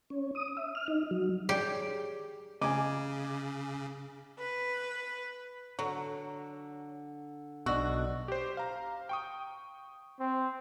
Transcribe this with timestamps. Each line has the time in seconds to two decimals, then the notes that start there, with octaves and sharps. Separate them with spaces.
0.10 C#4
0.35 D#6
0.57 E5
0.75 F6
0.88 D#4
1.11 F#3
1.49 G4 G#4 C#5 D5
2.61 C#3 D#5 G#5 D6
4.38 B4
5.79 D3 F#3
7.66 B1 B2 D4 F#4 D#5 E6
8.28 G4 C5
8.57 F5 A#5
9.09 G5 C#6 D#6
10.20 C4